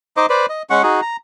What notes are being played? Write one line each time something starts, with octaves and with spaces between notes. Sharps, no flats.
D#4 C5 D#5 D6
B4 C5 D5
D#5
G#3 C#4 F#5 C#6
D#4 F#4 G#4
A#5